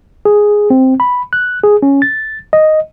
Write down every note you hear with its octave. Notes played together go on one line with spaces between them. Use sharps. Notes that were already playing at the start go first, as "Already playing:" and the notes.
G#4
C4
B5
F#6
G#4
C#4
A6
D#5